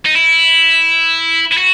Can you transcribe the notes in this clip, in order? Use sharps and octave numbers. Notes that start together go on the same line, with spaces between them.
D#4
E4
E4
F#4